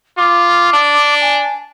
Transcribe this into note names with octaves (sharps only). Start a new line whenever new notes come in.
F4 D6
D4
G#5